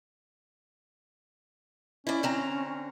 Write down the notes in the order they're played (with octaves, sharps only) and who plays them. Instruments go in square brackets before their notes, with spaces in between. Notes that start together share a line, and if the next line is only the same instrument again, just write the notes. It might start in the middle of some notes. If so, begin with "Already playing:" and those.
[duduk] C#4 [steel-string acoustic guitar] E4 D5
[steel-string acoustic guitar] D3 C4 A#5